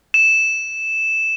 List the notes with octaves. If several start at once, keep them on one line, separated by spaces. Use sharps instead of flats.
E7